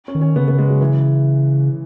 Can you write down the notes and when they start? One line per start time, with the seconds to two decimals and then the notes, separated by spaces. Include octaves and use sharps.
0.08 C#4
0.15 D#3
0.21 C#4
0.36 C#3 B3
0.48 B3
0.58 G#3
0.69 F#3
0.81 E3